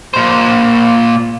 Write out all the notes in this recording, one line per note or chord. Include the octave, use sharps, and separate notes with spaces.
A#2 C5